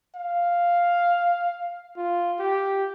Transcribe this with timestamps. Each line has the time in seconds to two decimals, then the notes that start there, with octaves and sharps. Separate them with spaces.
0.15 F5
1.97 F4
2.39 G4